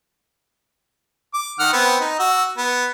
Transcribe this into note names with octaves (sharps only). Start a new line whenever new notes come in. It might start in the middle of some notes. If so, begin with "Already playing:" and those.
D6
D#3 F#5 F6
B3 C4
D#4
F#4 E6
B3